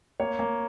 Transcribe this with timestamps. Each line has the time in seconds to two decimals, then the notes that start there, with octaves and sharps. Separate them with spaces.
0.20 A#3 C#5
0.39 A#3